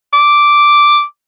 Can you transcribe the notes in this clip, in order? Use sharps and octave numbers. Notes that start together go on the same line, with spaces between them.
D6